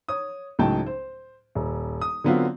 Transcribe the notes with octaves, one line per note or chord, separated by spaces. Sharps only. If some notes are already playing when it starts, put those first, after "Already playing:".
C#5 D#6
C#2 A2 F#3 D#4 G5 A5
C5
D#1
D#6
D3 F#3 B3 C4 F4